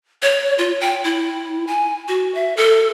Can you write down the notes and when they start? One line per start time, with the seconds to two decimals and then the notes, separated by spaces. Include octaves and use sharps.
0.22 C#5
0.58 F4
0.81 G5
1.04 E4
1.67 G#5
2.08 F#4
2.35 E5
2.57 A4